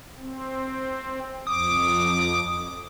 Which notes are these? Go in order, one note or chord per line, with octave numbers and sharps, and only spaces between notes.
C4
F2 D6 D#6